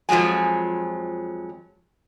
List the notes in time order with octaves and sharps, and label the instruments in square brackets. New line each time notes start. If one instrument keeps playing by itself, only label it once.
[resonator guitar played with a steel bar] F2 F3 F#3 G#3 G#5